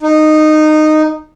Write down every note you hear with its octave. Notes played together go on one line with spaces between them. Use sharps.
D#4